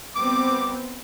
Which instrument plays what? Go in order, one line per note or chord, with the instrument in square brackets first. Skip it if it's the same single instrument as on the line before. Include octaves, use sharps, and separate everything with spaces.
[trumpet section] G3 D6 [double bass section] B3 C4